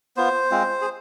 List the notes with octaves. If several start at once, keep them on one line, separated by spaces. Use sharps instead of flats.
B3 F4 C5
G#3 C4 F4
G#4